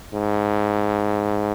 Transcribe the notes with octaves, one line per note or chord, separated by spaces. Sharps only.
G#2